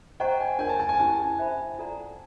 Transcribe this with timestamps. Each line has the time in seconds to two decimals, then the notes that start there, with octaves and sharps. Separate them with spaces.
0.20 C5 D#5 F#5 G5 A#5 C#6
0.40 G#5
0.59 D4 F4 A#4 C#5 G#5
0.69 A5
0.79 A5
0.89 G#5
0.99 C#4 E4 G4 A5
1.19 G#5
1.38 C5 E5 G5 B5
1.78 F4 A4 D5 F#5 A#5